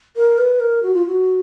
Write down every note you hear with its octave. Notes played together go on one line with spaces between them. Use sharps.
A#4
B4
A#4
F#4
F4
F#4